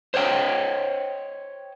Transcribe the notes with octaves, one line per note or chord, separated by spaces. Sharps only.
C5 C#5 D#5 G5